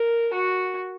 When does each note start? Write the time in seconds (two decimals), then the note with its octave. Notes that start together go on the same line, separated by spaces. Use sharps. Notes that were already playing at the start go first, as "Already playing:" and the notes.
Already playing: A#4
0.34 F#4